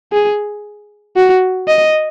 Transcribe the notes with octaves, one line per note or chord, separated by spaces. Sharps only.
G#4
F#4
D#5